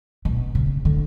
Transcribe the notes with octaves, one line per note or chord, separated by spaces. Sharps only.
B2
C#3
D3